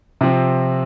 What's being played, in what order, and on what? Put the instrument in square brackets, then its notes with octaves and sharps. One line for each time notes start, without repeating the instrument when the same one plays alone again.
[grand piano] C3 F3 C4